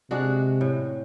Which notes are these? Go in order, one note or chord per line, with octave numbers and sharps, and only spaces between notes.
C3 G#3 D4 F#4
A2